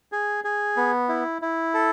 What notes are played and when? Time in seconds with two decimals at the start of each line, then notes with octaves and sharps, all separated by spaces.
0.12 G#4
0.44 G#4
0.77 B3
1.09 E4
1.42 E4
1.74 A4